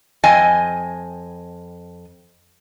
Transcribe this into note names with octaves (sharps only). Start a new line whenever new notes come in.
F2 D#5 G5 G#5